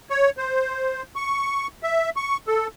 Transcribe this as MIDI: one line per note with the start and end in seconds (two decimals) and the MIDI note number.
0.10 0.30 73
0.38 1.03 72
1.16 1.67 85
1.83 2.10 76
2.17 2.37 85
2.47 2.67 69